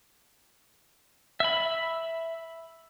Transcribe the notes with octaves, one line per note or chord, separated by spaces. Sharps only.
E5 B5